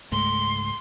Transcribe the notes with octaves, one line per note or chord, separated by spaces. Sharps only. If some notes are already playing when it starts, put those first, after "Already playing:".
C#2 G#2 A3 C6